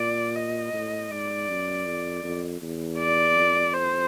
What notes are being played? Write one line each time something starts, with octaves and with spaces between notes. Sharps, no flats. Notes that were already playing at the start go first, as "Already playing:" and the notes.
Already playing: A#2 D5
D#5
A2
G#2 D5
F#2
F2
F2
E2
D5
F2
C5